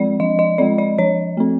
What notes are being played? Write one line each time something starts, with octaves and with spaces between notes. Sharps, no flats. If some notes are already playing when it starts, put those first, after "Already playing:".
Already playing: F3 G#3 C4 D5
F3 D#5
D#5
G#3 C4 D5
D5
F3 C#5
A3 C4